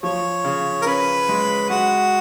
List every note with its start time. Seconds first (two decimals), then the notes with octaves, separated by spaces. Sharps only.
0.03 F3 C#5
0.44 C#3
0.82 A#4
0.86 C#4 B4
1.29 G#3
1.70 G#3 F#4